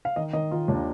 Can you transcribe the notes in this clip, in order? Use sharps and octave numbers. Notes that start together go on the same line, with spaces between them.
F5
D#3 D#5
D#3 D#5
D#3 F4
D#2 D4